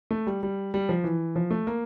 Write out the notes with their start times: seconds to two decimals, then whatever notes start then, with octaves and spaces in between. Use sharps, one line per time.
0.11 A3
0.27 G3
0.43 G3
0.74 G3
0.89 F3
1.04 E3
1.36 F3
1.51 A3
1.67 A#3